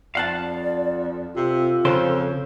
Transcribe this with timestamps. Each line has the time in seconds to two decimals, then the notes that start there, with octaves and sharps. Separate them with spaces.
0.15 F2 D5 F5 F#5 A5
1.36 C3 F4 A4
1.85 F2 C#3 C5 C6